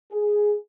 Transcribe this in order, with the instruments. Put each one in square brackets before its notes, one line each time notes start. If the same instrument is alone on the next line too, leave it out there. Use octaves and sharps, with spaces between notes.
[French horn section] G#4